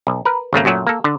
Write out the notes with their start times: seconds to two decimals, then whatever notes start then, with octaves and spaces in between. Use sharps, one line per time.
0.07 B1
0.25 A#4 B4
0.53 G#1 C#3 A3 A#3
0.65 F#2 A#2 F#3 A3
0.87 A#3 A4
1.04 D3